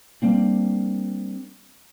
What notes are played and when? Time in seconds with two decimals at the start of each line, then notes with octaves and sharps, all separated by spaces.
0.22 G3 A#3 C4 D4